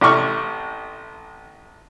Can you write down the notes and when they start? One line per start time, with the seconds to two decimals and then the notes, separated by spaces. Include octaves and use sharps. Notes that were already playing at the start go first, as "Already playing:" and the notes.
0.01 A1 C3 D5 C#6 F6